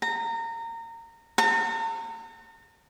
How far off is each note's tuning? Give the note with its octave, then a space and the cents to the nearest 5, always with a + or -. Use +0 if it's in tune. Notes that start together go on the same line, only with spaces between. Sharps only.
A#5 -25
A#5 -40